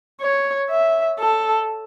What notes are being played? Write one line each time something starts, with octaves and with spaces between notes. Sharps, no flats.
C#5
E5
A4